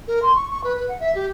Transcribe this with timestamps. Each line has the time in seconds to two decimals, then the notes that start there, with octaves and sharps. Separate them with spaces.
0.07 A#4
0.22 C6
0.35 C#6
0.50 C#6
0.64 B4
0.76 B4
0.88 F#5
1.00 E5
1.15 G4